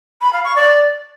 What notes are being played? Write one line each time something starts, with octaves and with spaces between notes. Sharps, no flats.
B5
F5
C#6
D5